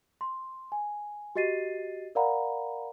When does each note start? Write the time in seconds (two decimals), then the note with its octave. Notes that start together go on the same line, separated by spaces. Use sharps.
0.21 C6
0.72 G#5
1.35 F#4 G4 D#5 A6 C7 D#7
2.15 A#4 D5 F5 F#5 A#5 B5